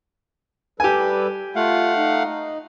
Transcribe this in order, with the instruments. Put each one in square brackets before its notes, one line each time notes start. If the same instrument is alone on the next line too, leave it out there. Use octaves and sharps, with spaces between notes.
[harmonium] G3 A4 B4 [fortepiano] G4 G#5
[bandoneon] A3 F5 F#5 [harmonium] F4
[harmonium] D#4